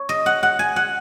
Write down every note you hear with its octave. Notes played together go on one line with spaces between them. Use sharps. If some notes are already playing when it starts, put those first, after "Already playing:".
Already playing: C#5
D#5
F#5
F#5
G#5
F#5